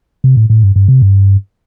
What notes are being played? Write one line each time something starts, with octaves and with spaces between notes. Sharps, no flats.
C3
A2
A2
G2
G2
C3
G2